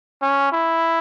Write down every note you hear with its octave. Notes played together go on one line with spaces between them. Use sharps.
C#4
E4